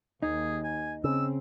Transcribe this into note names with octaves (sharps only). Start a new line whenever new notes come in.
D#2 D#4 G#4
G#5
C#3 C4 E6